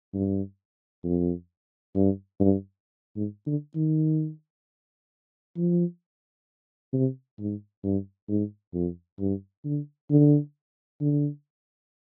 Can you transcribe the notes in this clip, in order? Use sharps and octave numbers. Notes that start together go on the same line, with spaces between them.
G2
F2
G2
G2
G#2
D3
D#3
F3
C3
G#2
G2
G#2
F2
G2
D3
D3
D3